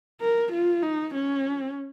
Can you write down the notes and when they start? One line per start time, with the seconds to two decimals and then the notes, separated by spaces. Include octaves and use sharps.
0.21 A#4
0.52 F4
0.82 D#4
1.14 C#4